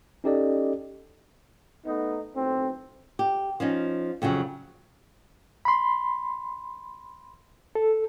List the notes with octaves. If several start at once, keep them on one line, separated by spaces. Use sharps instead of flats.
C#4 D#4 G4 A4 D5 D#5
A3 B3 D#4
B1 A2 C4
G4
F3 C#4 D#4
F2 C#3 F3 F#3
B5 C6
A4